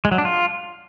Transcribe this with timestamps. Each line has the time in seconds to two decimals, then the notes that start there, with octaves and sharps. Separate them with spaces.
0.05 G#3
0.12 F#3
0.18 D4
0.25 F4